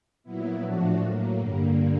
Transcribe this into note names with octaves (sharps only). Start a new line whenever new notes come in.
A#2 F#3 B3 E4
A2 F3 A3 D4 F#4
A2 F#3 A#3
G2 D3 G3 A#3